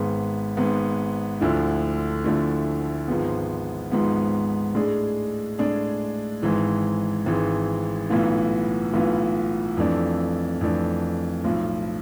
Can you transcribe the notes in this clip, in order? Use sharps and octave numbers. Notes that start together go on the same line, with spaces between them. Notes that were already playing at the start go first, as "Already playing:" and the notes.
Already playing: G#1 G#2 G#3 B3
G#1 G#2 G#3 B3
D2 D3 F3 A3 E4
D2 D3 F3 A3 E4
G#1 G#2 F3 G#3 B3
G#1 G#2 F3 G#3 B3
A2 G#3 D4 G#4
A2 G#3 D4 G#4
G#1 G#2 E3 G#3
G#1 G#2 E3 G#3
B1 A2 E3 B3 F4
B1 A2 E3 B3 F4
F2 E3 A3 D4
F2 E3 A3 D4
B1 A2 F3